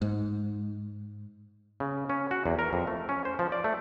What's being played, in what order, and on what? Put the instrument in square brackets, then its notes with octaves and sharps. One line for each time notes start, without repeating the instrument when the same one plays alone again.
[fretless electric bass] G#2
[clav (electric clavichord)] C#3
C#4
F#4
E2
A#4
F2
A3
C#4
C5
F3
D5
A3